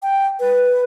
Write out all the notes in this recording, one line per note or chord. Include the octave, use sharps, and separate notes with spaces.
G5
B4